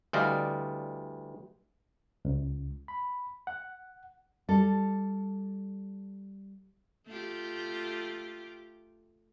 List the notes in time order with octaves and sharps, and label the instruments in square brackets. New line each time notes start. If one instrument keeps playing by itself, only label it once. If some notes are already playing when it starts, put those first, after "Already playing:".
[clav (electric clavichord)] D2 E3 G3 D5 D#5 F5
[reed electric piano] C#2
B5
F#5
[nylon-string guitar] G3 A4
[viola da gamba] A3 F4 G4